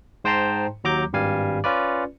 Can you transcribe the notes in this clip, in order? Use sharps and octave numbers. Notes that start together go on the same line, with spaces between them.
G#2 C5 G5 A5 A#5 C6
D#2 F#3 A#5 D6 G6
G#1 G2 G3 F5 G#5
C#4 F4 B4 D5